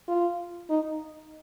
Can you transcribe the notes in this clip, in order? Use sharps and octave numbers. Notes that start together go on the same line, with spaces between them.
F4
D#4